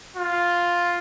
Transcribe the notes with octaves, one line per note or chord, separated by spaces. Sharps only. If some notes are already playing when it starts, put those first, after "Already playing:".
F4